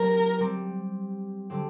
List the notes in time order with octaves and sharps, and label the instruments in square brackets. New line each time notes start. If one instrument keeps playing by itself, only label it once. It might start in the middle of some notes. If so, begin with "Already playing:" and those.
Already playing: [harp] F#3 C4 G4 [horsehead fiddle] A#4
[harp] G3 C4 G4
D3 F#3 C4 G4